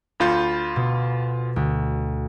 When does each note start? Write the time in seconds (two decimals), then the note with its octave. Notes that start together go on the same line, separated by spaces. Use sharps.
0.20 D2 F4 B5 G6 C#7
0.76 B2
1.56 D2